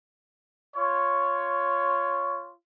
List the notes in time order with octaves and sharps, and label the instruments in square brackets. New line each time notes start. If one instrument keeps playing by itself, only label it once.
[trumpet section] F4 C#5